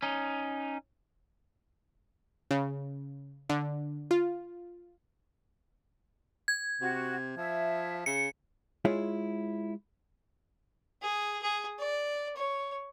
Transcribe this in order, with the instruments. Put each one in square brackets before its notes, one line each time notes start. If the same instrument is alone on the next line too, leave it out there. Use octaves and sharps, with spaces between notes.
[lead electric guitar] C#4 D#4
[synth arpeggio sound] C#3
D3
F4
[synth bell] G#6
[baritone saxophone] C3 [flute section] F#4
[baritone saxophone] F3 [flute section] E5
[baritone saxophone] C#3 [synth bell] C#7
[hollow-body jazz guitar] G#3 E4 F4 G#4 C#5 E5
[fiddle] G#4
G#4
D5
C#5